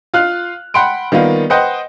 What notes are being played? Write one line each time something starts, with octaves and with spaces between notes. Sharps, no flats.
F4 F5 F6 F#6
F#5 G5 B5 C6 D7
D#3 G3 A#3 B3 F4
B4 C5 D#5 F#5 G5